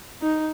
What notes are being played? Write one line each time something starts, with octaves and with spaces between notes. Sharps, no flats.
D#4